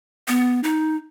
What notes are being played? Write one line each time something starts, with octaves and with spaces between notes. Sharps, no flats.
B3
D#4